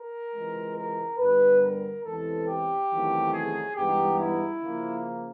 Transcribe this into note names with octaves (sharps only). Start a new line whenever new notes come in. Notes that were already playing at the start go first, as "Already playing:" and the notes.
Already playing: A#4
C#2 C3 E3 G#3
A#4
G2 D3 G3 B3 B4
A#4
E2 C3 E3 G#3 A4
G4
E2 C3 D#3 F#3 A3
G#4
G2 E3 G#3 B3 D#4 G4
E4
C#3 F3 A#3